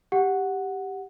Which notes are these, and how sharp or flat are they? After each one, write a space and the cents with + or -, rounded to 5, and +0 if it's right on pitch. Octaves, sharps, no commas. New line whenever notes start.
G4 +0 F#5 +0